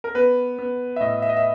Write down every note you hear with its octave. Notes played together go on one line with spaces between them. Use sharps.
A#4
B3 B4
B3
E5
A2 D#5
E5
D#5
E5